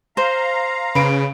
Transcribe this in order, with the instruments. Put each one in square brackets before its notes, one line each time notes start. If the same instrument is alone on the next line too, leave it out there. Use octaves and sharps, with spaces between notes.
[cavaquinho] C5 [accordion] F5 A#5
[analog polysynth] C#3 [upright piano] B4 D7